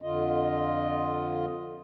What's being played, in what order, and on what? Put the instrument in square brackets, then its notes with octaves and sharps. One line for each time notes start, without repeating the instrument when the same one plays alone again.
[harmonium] F2 D3 F4 D#5